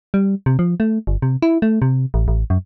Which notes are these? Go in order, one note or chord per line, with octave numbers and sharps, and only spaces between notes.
G3
C3
F3
A3
G1
C3
E4
A3
C3
A1
A1
F#2